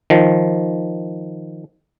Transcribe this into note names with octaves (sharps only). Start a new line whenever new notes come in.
D#3 F3